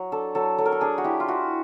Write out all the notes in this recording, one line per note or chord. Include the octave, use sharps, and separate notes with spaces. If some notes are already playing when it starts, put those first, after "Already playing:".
Already playing: F#3
D4 A4
F#3 A4
F#3 A4
A#4
A4
D4 G#4
F#4
E4 G4
F4
E4 F#4